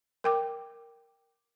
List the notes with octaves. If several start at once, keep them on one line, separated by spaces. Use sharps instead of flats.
A#4 G5 D6